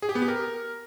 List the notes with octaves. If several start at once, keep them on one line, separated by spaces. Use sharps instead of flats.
G#4
G4
B3
G4
A#4